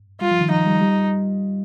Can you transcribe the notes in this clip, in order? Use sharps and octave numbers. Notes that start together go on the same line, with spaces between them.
G3 F4
F3
D#3
F3 D#4
G3
G3